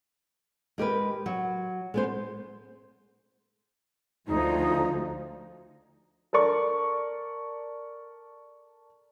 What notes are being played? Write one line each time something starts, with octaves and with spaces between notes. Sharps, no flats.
G#3 G4 A#4 B4
F#3
G#3 B3 C5
D2 F3 D#4
A4 A#4 D5 C#6